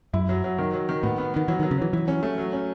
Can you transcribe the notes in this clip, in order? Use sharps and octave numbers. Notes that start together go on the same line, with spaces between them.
F#2 E4
F#3
F#3
D#3
F#3
D#3
A2 B3
B3
D#3 B3
E3 F#3
D#3
F#3
C#3
E3 F#3
E3 F#3
C#4
A3
F#3
C#4